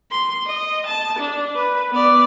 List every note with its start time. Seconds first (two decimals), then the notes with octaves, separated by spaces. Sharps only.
0.11 C6
0.46 D#5
0.87 A5
1.19 D4
1.55 B4
1.91 B3 D5